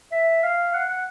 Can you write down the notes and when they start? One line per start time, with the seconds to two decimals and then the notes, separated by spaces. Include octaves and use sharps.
0.12 E5
0.43 F5
0.74 F#5
0.89 F#5